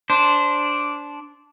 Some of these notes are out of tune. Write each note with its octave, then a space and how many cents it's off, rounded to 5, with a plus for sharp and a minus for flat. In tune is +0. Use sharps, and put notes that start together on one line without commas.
D4 -15 C5 +0